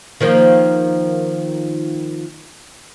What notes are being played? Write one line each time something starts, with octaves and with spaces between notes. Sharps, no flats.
D#3 F3 A#3